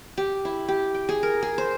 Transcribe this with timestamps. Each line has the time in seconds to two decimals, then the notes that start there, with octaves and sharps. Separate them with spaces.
0.18 G4
0.45 E4
0.68 G4
0.95 G5
1.09 G#4
1.23 A#4
1.43 G#4
1.58 C5